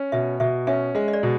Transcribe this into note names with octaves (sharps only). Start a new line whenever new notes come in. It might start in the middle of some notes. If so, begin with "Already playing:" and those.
Already playing: C#4
B2 E5
B2 E5
C#4 E5
G#3 D#5
D#5
D5
B2